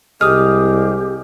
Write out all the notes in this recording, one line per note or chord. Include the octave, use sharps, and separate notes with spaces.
C2 G#3 G4 D#6 F6